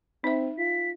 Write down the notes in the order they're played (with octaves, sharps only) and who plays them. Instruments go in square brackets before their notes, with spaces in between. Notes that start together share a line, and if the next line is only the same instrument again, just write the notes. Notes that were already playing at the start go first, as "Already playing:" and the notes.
[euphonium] C4 [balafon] D#4 E5
[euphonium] F4 [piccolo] B6